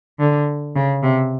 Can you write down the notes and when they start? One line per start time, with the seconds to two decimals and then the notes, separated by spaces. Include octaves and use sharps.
0.19 D3
0.76 C#3
1.03 C3